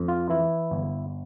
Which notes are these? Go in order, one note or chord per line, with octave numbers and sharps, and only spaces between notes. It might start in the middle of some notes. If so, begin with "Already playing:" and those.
Already playing: F2
F4
E3 E4
G1